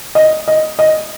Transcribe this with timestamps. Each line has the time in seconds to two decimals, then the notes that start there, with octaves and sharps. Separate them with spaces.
0.15 D#5
0.48 D#5
0.79 D#5